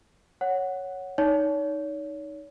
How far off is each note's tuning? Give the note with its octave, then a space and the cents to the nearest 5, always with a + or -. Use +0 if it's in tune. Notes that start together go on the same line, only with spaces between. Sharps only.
C#5 +0 F#5 +0
D#4 +0 C#5 +35